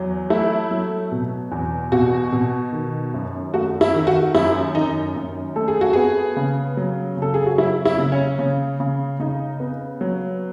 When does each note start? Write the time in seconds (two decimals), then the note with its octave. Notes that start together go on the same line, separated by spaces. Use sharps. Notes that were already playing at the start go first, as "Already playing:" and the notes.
Already playing: E2 F#3
0.30 A3 E4
0.71 F#3
1.12 B2
1.52 E2
1.92 B2 F#4
2.33 B2
2.73 D#3
3.14 F#2
3.54 A3 F#4
3.81 E4
3.94 D#3
4.07 F#4
4.35 F#2 E4
4.75 D#3 D#4
5.16 F#2
5.56 A3 A4
5.68 G#4
5.81 F#4
5.93 B3 G#4
6.37 C#3
6.77 F#3
7.17 C#3
7.22 A4
7.34 G#4
7.46 F#4
7.58 F#3 E4
7.85 E4
7.98 C#3
8.12 C#4
8.39 C#3
8.80 C#3
9.19 C#3 D#4
9.60 B3
10.01 F#3